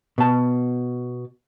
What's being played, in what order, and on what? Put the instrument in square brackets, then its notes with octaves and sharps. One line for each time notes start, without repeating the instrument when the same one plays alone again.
[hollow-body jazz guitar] B2 A5